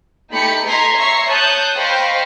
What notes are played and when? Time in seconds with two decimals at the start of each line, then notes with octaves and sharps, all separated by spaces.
0.31 A3 D#4 G4 B5 C#7
0.66 D#5 A#5 C6 G#6 A#6 B6
0.96 C#5 E5 A#5 C#6 C7
1.27 C#5 A5 D#6 F#6 G6
1.77 C5 D#5 F5 G5 B5 C#6